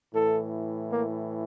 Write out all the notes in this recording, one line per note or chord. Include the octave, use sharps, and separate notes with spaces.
A2 E3 A4
A#3